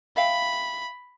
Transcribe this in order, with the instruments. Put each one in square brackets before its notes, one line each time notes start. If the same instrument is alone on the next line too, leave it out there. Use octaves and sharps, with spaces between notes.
[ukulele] E5 F5 G5 [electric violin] B5